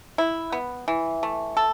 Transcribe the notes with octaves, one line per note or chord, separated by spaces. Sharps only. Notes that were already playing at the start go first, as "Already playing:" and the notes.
E4
B3
E3
A3
A4